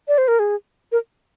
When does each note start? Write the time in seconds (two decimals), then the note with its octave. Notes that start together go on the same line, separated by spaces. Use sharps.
0.08 D5
0.18 C5
0.28 A#4
0.39 G#4
0.92 A#4